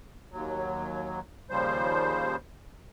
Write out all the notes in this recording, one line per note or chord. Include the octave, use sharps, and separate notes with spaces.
D#2 F#3
D#2 C#3 F3 G3 C5